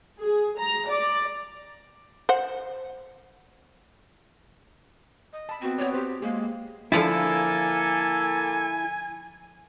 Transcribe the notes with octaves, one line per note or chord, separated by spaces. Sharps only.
G#4
A#5
D5
C5 F#5
D#5
A5 B5
B3 C4 F#4
F#4 C#5 D5
G4 C5 B5
G#3 A#3 G#4
D3 F3 A#3 E4 A4 G#5 A5